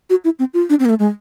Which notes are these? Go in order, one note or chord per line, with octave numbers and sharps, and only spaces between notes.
F#4
E4
C4
F4
D4
C4
A#3
A3
G#3